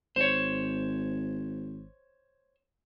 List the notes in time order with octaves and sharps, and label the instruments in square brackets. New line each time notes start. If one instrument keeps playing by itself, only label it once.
[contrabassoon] G#1 [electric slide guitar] C5 C#5